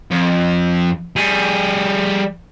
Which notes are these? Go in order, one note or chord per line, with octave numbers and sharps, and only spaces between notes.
F2
G3 G#4